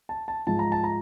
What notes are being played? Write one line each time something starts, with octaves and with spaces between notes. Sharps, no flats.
A5
A5
G#2 F3 A5
A#5
A5
A#5